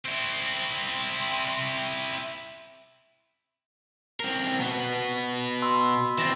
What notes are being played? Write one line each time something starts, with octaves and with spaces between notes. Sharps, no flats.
C4 E4
C4 A#4 C7
B2 B3
B5 C6 E6
E3 C4 A6 A#6 E7